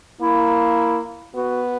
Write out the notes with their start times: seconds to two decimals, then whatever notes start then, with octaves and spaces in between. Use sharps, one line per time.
0.21 A#3 E4
1.35 B3 F#4